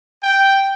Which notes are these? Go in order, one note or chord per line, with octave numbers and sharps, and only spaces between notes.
G5